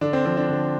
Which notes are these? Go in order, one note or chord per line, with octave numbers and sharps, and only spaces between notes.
D3 D4
C4
F3 C4
D4
D3